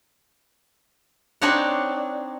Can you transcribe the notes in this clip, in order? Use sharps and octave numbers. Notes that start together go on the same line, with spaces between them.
C4 D4 D#4 C#5 D5 F#5